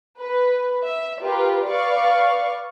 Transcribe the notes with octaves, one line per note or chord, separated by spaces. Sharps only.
B4
E5
F4 G4 A#4 B4
B4 D5 F5 C#6